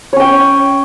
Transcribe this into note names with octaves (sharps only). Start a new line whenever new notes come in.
C#4 C#5 G5